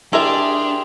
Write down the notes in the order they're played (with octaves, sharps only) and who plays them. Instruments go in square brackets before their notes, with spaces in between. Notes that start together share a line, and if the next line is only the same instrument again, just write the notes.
[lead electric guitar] D4 [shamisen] E4 A#4 E5 [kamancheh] G4 G#4 [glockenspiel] C6 F7